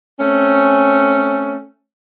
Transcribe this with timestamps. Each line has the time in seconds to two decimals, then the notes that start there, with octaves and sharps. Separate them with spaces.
0.20 A3 C4 C#4